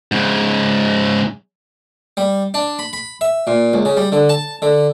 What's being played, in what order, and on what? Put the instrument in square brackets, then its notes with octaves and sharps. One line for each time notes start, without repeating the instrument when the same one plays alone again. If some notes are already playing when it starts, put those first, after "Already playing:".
[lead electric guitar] G#2 C#3
[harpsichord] G3
D4
B5
B5
E5
A#2
C#2
C#3
G3
D3
A5
D3